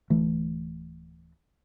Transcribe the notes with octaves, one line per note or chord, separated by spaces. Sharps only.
D1 E3 A3